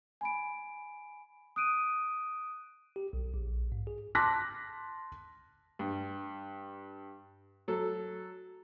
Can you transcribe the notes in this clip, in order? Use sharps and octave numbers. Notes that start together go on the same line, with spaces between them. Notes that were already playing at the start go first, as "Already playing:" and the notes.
G#5 B5 D7
D#6 F#6 D7 D#7
G4
B1
A#1
G#2
G#4
A5 C6 D6 F#6 A#6 B6
G2
F#3 A4